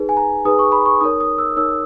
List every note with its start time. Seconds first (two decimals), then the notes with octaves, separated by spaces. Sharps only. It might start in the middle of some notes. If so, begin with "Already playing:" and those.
Already playing: D#4 G#4 B4
0.09 G#5
0.17 A#5
0.45 D#4 G#4 B4 D#6
0.59 C#6
0.72 B5
0.86 C#6
1.01 D#4 A#4 C#5 D#6
1.20 D#6
1.38 E6
1.57 D#4 A#4 C#5 E6